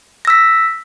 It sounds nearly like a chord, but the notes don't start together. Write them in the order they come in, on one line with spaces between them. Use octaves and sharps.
A#6 E6 B6